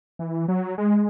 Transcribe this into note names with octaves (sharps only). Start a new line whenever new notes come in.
E3
F#3
G#3